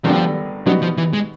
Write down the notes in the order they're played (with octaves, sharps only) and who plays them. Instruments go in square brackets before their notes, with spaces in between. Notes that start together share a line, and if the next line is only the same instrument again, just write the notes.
[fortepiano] G#1 G2 D3 G3 B3 [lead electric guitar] F3
[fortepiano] B2 G3 B3 D#4 [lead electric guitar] F#3
[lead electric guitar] F3
E3
G#3